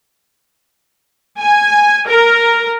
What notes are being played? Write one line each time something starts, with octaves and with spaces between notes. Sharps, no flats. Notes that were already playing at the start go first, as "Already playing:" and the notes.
G#5
A#4